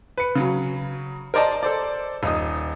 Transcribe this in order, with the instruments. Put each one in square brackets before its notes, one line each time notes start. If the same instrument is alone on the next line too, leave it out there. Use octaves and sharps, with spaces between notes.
[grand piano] B4 C#7
C#3 F#3
A#4 C5 D5 D#5 A5
A4 C5 D5
D#1 D#4 D#6